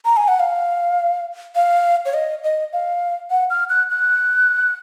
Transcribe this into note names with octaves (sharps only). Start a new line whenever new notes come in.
A#5
G#5
F#5
F5
F5
C#5
D#5
D#5
F5
F#5
F6
F#6
F#6